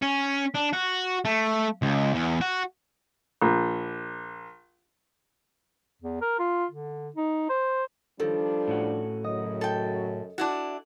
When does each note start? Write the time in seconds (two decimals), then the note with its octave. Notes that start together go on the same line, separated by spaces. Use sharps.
0.02 C#4
0.55 D4
0.73 F#4
1.25 A3
1.82 C#2
2.14 E2
2.41 F#4
3.42 A#1
6.02 E2
6.22 A#4
6.39 F4
6.71 D3
7.16 D#4
7.50 C5
8.20 D#3 F3 G3 D4 A4
8.67 A2 C#4 F#4
9.24 F#2 C#3 F#3 D#5
9.61 A4 G5
10.38 D4 E4 F#4